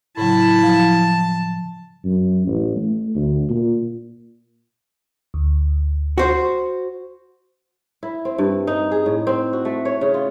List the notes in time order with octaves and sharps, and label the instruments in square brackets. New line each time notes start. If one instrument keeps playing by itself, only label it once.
[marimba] A2 C#3 F#3 [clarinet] E4 [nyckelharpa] A5
[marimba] F3
[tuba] F#2
A1
A3
D2
A#2
[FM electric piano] D2
[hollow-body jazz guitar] F#4 C5
[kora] E4
C4
G2
D#4
G#4
A2
C4
F#4
A3
C#5
C#3
F4